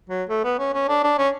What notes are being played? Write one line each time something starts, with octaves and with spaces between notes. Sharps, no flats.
F#3
A3
B3
C#4
C#4
D4
D4
C#4